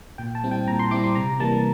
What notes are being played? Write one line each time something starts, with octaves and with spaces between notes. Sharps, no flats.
A#2 G5
A5
G3 C4 E4
G5
A#2 A#5
C6
G3 C4 E4 D6
C6
C3 A#5
E3 G3 A#3 A5